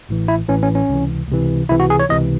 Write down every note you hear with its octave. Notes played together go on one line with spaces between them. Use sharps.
A1 A2 E3
E4
A1 A2 E3 C#4
C#4
C#4
C#2 C3 E3
C#2 C3 E3
C#2 C3 E3 E4
F#4
G#4
C#5
C#2 C3 E3 D#5